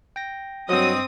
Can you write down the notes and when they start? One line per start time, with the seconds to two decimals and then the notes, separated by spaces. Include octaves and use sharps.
0.16 G5 A#6
0.69 G2 F#3 C4 D#5 D#6